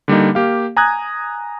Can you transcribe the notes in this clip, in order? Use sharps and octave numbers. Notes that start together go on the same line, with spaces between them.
D3 G3 A#3 D#4
A#3 G4 F5
G#5 A#5 D#6 F#6 G#6